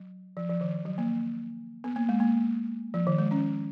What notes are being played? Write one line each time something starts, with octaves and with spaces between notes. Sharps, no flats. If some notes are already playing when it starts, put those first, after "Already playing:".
Already playing: F#3
F3
F3
D#3
F#3
A#3
B3
A#3
G#3
A#3
F3
D#3
G#3
C#4